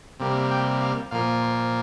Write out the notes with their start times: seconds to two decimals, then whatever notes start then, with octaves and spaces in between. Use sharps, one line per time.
0.20 C3 G3 A#3
0.51 G5
0.81 F5
1.11 A#2 F3 A#3 F5
1.42 C5